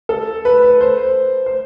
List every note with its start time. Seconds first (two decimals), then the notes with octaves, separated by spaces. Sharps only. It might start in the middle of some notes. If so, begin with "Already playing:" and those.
0.09 A4
0.45 B4
0.63 B4
0.81 C5
1.46 C5